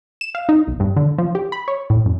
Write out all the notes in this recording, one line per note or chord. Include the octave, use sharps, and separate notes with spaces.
E7
F5
D#4
B1
G2
D3
F3
G4
B5
C#5
A2
F#2